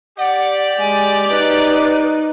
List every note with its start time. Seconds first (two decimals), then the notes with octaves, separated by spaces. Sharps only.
0.18 G4 D5 F#5
0.78 G#3 G#5
1.29 D#4 B4